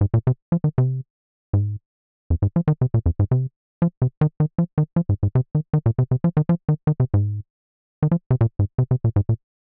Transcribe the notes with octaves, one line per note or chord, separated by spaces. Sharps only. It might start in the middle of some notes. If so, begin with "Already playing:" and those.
G#2
A#2
C3
F3
D#3
C3
G#2
F2
G#2
F3
D#3
C3
A#2
F2
G#2
C3
F3
C3
D#3
D#3
F3
D#3
F3
G#2
G#2
C3
D#3
D#3
A#2
C3
C3
F3
D#3
F3
D#3
D#3
C3
G#2
D#3
F3
C3
A#2
G#2
C3
C3
A#2
G#2
A#2